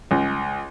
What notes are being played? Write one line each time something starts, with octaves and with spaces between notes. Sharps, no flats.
C#2